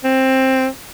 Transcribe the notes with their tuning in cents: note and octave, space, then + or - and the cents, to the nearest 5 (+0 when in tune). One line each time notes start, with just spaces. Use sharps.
C4 +10